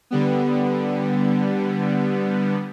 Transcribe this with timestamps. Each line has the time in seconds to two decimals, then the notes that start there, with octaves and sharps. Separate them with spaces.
0.11 D3 G3 B3